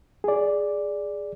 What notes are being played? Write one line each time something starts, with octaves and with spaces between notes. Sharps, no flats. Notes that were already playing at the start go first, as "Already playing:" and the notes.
G#4 D5